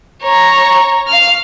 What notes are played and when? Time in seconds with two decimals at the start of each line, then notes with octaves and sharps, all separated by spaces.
0.22 C#5 A#5
1.08 F5 F6